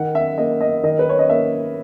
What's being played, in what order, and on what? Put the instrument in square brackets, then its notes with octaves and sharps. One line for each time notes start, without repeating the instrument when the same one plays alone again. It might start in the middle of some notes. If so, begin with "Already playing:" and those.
Already playing: [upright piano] D#3 F#5
E5
A#3 D#5
D#5
D#3 D#5
B4
C#5
D#5
A#3 E5